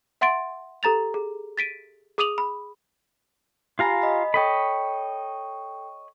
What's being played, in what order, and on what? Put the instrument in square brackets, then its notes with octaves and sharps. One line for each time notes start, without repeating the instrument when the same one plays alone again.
[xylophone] E5 F#5 C6 A6 D7
G4 A4 A#5 A6 F7
G#4
A6 B6 D7 D#7
G#4 D6 D#6 D#7 F7 F#7
B5
[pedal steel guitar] F4 F5 A#5 [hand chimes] G4 G#5 B5
[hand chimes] D#5 B5
[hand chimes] A4 G5 [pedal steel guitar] C#5 D#5 B5